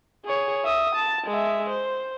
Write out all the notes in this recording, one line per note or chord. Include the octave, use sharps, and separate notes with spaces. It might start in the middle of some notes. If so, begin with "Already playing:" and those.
G#4 C#5
E5 D#6
A5
G#3 E5
C5